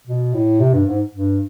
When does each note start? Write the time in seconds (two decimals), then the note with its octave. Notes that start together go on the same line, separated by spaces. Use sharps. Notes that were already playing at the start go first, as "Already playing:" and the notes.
0.07 B2
0.34 A2
0.60 C3
0.73 G2
0.87 G#2
1.13 G2